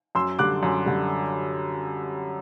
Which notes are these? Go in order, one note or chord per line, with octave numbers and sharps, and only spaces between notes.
F#2 C6 E6
D3 G3 D6 F#6
F#2
D3 G3